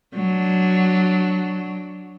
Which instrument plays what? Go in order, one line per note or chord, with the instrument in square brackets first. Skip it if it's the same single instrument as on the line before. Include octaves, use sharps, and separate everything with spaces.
[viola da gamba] F#3 D4